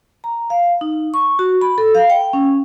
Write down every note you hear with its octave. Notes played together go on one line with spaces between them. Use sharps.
A#5
F5
D#4
C#6
F#4
B5
A4
F5
G5
C#4